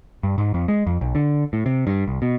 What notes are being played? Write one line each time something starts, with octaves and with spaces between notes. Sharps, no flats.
G2
G#2
F2
G#3
F2
B1
D3
A2
C3
G2
C2
B2